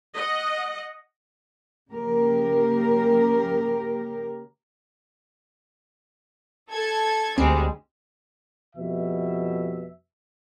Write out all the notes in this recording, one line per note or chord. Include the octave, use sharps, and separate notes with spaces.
D#5 F#5
C#3 A#3 G4 A#4
A4 G#6
D2 G3 G#3 C4
F2 B2 G3 E5